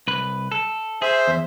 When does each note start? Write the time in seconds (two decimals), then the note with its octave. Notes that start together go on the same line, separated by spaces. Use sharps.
0.08 C2 B4
0.52 A4
1.02 G#4 C5 E5
1.28 E2